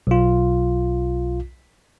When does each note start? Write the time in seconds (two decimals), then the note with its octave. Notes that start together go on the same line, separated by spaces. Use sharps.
0.07 B1 F4